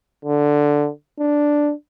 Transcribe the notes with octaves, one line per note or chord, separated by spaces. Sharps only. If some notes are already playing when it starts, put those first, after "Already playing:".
D3
D4